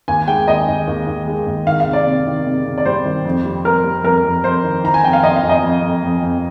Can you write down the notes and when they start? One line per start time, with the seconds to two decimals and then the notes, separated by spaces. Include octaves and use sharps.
0.08 D#2 G#5
0.27 G#3 G5
0.48 D#2 D#5
0.68 D#2
0.88 D#2
1.07 D#2
1.27 G#3
1.46 D#2
1.67 D#3 F5
1.80 F5
1.86 C3
1.93 D5
2.06 C3
2.26 D#3
2.46 C3
2.65 C3
2.78 D5
2.85 G3 C5
3.05 D#3
3.25 F2
3.45 G3
3.65 F2 A#4
3.84 G3
4.04 F2 A#4
4.24 F2
4.44 F2 C5
4.64 D#3
4.84 D#3 A#5
4.94 G#5
5.03 F2 G5
5.13 F5
5.23 F2 D#5
5.36 F5
5.43 F2
5.49 D#5
5.63 F2
5.82 F2
6.03 F2
6.22 F2